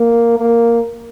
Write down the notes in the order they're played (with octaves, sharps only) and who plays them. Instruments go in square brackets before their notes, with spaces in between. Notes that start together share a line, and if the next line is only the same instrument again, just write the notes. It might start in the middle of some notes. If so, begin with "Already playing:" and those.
Already playing: [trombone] A#3
A#3